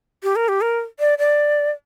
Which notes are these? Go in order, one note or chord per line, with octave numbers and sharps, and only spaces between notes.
G4
A#4
G4
A#4
D5
D5